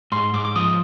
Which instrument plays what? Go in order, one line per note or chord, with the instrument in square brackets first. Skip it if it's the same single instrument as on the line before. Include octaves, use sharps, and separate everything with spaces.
[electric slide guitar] G#2 [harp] C6
[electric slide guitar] G#2 [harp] D6
[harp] D6
[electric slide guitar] F3 [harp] D#6